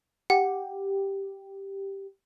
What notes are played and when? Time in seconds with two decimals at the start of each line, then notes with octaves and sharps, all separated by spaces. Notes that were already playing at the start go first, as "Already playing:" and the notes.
0.30 G4 F#5